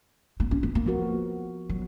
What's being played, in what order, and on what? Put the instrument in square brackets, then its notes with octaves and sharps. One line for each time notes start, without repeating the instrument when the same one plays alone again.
[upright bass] A#3
C#4
B3
A#3
[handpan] F3 B3 F#4 A#4
[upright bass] F#3